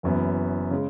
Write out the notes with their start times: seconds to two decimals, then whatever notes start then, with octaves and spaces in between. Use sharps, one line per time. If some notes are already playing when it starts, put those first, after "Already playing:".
0.03 F#1 F#2 E3 B3
0.71 C#3 G#3